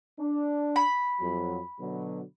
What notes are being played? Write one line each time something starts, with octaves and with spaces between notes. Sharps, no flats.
D4
B5
F2 F#3
B2 D3 F#3